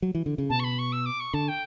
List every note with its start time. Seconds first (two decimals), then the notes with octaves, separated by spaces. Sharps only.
0.02 F#3
0.15 E3
0.26 D3
0.38 C#3
0.49 B2 A5
0.59 C#6
0.64 B5
0.78 C#6
0.92 E6
1.06 D6
1.20 C#6
1.34 D3 A5
1.48 G5